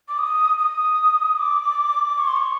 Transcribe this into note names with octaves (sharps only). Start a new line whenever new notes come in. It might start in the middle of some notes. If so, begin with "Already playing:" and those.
D6
D#6
D#6
D6
C#6
C6
C#6